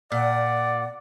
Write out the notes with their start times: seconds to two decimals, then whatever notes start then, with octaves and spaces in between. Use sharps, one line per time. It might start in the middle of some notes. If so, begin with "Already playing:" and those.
0.12 A#2 D5 F#5